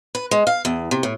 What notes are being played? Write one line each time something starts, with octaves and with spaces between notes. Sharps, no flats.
B4
G#3
F5
E2
C3
A2